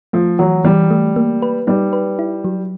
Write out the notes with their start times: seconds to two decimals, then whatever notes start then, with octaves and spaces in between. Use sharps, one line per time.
0.13 F3 A3
0.39 E3 F#3
0.64 E3 G3
0.91 A3
1.16 A#3
1.42 B4
1.67 G3 D#4
1.93 B4
2.19 E4
2.44 F#3